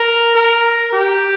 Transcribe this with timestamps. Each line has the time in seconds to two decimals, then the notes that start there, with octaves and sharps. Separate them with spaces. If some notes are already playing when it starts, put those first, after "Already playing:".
Already playing: A#4
0.35 A#4
0.93 G4